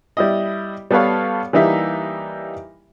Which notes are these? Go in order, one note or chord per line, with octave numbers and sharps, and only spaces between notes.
G3 E4 D#5
G3 B3 A4 B4 C#5 F5
E3 G3 A#3 D#4 G4 E5